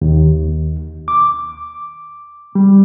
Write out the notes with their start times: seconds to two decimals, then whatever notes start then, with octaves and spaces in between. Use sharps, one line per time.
0.02 D#2
1.08 D6
2.55 G3